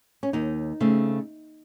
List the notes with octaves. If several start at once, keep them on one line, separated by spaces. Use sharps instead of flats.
C#4
D#2 D#4
C#3 A3 C4